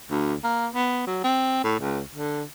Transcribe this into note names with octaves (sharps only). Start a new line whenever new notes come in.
D2
A#3
B3
F#3
C4
A2
C#2
D3